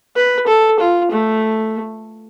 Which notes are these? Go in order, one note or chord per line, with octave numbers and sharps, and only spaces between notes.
B4
A4
F4
A3